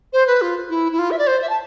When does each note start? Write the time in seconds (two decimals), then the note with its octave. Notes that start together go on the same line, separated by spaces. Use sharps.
0.13 C5
0.27 B4
0.42 F4
0.70 E4
0.92 E4
0.99 F4
1.11 E5
1.19 D5
1.27 C5
1.42 E5
1.49 A5